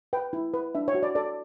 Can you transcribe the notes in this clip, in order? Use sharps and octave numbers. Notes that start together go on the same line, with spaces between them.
B4 G5
E4
B4
D4 E5
C#5
F#4
D5
A4 D5